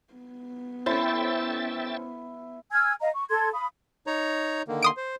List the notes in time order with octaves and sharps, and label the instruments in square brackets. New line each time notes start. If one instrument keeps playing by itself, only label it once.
[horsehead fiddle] B3
[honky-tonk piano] C#4 A4 C5 [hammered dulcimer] E4 [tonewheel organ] E5 G5 A6
[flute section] G#5 E6 F6 G#6
D#5 F5 A#5
C#6
A4 C6 G#6
F5 B5 D#6
[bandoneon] D#4 C#5 A#5
D3 D#3 A#3
[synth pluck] C6 D#6 D7
[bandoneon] C5